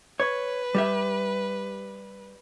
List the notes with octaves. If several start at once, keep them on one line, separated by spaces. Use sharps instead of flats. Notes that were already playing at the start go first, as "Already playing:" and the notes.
B4 C#5
G3 G4 E5